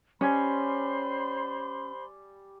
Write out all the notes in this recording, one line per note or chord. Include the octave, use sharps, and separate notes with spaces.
G3 C#4 C5 G#5 B5 C6